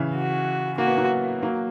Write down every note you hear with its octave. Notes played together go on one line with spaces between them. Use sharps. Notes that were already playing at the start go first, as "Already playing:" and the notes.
Already playing: C#3 E3
F#4
A#3 F#4
B3
F#3 A#3
F#3 A#3